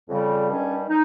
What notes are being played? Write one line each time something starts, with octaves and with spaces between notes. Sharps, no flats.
F2 C#3 G3
G2 D#3 G3 C#4
D#4